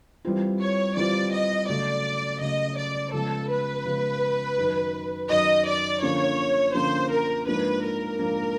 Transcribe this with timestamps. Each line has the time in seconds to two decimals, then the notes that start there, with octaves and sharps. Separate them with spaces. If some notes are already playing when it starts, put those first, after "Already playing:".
0.25 E3 G3 C4 F4
0.60 C#5
0.97 E3 G3 C4 F4 D5
1.32 D#5
1.68 C#3 F#3 A3 D5
2.41 C#3 F#3 A3 D#5
2.77 D5
3.13 C#3 F3 G#3 B3 A4
3.50 B4
3.85 C#3 F3 G#3 B3
4.58 F#2 D#3 F#3
5.30 F#2 D#3 F#3 D#5
5.66 D5
6.02 D3 F3 A#3 C#4 C#5
6.74 D3 F3 A#3 C#4 C5
7.11 A#4
7.47 G#2 F3 A#3 D4 B4
7.83 A#4
8.19 G#2 F3 A#3 D4